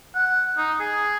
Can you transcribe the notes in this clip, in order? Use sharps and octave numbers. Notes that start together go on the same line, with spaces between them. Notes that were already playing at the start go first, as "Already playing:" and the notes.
F#5
D#4
G#4